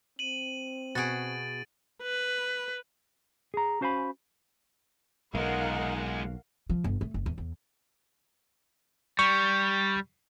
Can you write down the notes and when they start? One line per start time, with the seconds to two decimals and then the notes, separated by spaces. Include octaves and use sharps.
0.19 C4 D#7 F#7
0.95 B2 F#4 G#4 A6 D7
2.02 B4
3.54 G#4 A#5
3.81 C#4 F#4 C5 F5 G#5 B5
5.35 B1 G#3 D#4 F4 A#4 F5 F#5
6.69 F3
6.84 G1
7.01 A3
7.14 F#1
7.26 E2
7.38 E2
9.19 G3 C#6